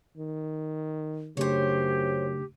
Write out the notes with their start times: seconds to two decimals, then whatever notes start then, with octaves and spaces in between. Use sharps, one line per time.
0.17 D#3
1.37 F#2 C#3 A3 D4 G4 C5 C#5